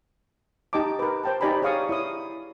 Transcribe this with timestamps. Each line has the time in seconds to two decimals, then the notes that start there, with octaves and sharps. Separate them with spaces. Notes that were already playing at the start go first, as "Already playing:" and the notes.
0.73 D#4 G4 D#5 A5 D6
0.99 A#4 B4
1.24 C5 G5 A5
1.41 D#4 G4 D5 G#5 A#5 B5
1.62 G#4 C#5 D5 F5 C#6 D#6
1.89 E4 C#5 D#6